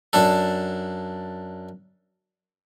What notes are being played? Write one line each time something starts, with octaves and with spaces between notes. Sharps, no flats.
F#2 D4 A4